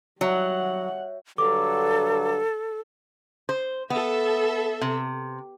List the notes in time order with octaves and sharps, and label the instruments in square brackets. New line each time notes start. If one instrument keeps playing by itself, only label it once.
[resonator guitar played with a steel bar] F#3 [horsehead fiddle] G3 F#5 [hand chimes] C#5 E5
[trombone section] G2 D3 F#3 [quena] A4 [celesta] D6
[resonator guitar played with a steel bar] C5
[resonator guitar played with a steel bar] B3 [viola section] A4 E5
[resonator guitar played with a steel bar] C3